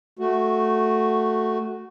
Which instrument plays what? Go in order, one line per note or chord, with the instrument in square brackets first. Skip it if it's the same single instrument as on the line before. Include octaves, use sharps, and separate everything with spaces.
[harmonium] A3 F#4